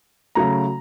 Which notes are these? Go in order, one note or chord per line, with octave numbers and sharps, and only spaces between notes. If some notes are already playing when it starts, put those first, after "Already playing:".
C#3 F#3 A3 A#5